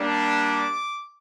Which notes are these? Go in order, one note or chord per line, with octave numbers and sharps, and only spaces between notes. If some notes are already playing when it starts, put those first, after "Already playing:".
Already playing: G3 A#3 D4
D6